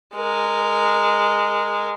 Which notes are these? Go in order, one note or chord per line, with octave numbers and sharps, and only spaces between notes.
G#3 A#4